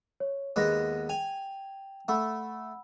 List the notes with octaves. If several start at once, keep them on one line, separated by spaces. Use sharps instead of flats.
C#5
D#2 G#3 B3 F#6 A#6
G5 G#5 F7
A3 F#5 B5 E6